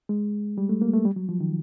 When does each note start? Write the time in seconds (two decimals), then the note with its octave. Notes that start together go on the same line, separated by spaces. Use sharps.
0.09 G#3
0.58 G3
0.69 A3
0.82 A#3
0.94 A3
1.05 G3
1.16 F#3
1.29 F3
1.40 D#3